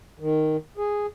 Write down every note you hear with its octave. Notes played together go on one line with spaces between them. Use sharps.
D#3
G#4